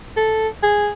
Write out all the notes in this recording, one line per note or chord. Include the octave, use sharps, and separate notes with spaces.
A4
G#4